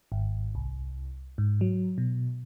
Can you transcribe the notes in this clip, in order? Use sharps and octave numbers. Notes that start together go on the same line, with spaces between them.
G#1
C2
G#2
F#3
B2